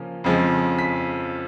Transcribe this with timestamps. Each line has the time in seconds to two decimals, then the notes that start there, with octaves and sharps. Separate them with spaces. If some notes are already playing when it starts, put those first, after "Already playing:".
Already playing: C#3 F3 A#3 C#4
0.24 F2 C#3 F3 G#3
0.79 B6